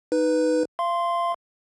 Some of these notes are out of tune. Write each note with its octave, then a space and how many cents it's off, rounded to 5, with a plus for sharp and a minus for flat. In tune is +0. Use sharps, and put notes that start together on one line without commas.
D#4 +0 B4 +0
F5 -30 C6 +0